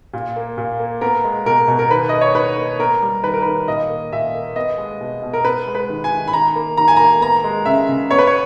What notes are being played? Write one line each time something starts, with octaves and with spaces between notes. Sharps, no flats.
A#2
A#3
A#2
A#3
B3 A#4
G#3
B2 A#4
B2
A#4
D#3 B4
A#3 D#5
C#5
D#3 B4
A#3
B3 A#4
G3
D#3 B4
A#4
D#3 B4
A#2 D#5
A#3
A#2 E5
A#3
B3 D#5
G#3
B2
B2
A#4
B3 B4
G#3
B4
D#3
G#5
D#3
B5
D#3 A#5
A#3
D#3 A#5
G#5
A#3 A#5
B3 A#5
G#3
C#3 E5
C#3
B3 C#5
B4
C#5